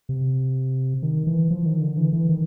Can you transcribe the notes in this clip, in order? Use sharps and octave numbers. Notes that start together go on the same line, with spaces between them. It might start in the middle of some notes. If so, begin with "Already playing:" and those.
C3
D#3
E3
F3
D#3
D3
E3
E3
D#3